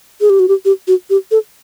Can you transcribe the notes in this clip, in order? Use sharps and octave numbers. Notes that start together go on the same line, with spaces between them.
G#4
G4
F#4
G4
G4
F#4
G4
A4